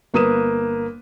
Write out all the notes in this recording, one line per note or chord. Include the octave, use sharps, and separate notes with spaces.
G1 A#3 B4 D#6 D#7 E7